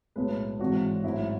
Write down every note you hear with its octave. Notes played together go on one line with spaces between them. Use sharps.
B1 A2 G#3 B4
G#1 G#2 E3 F#4
A1 G#2 F#3 E4